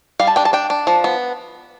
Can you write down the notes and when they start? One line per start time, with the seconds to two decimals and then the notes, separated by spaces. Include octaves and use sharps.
0.19 G3 F5
0.27 A5
0.36 D4 G5
0.45 A5
0.53 D4 G5
0.70 D4
0.87 F3
1.04 B3